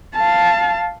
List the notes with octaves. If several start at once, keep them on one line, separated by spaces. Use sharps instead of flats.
F5 A5